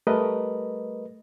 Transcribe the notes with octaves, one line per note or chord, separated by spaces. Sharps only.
G3 A3 A#4 B4 D#5